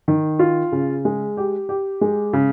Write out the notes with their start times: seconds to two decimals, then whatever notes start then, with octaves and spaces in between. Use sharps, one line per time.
0.08 D#3
0.39 F4
0.72 C#3
1.05 G#3
1.37 G4
1.69 G4
2.01 G#3
2.33 C#3